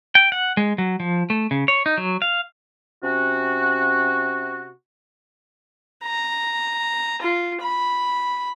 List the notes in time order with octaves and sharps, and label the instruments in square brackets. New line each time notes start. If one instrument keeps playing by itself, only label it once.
[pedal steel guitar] G5
F#5
G#3
F#3
F3
A3
C#3
C#5
D#4
F#3
F5
[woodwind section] C3 C#4 F#4
[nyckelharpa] A#5
F4
B5